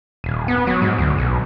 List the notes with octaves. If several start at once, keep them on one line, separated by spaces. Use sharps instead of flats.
D#1
B3
F#3
G#2
D2
B1